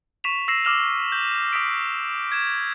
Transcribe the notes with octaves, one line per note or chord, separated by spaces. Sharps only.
C#6 B6 E7 F7
E6 A#6 C7 E7
D6 E6 F6 E7 F7
G6
D#6 A#6 B6 D7
G#6 E7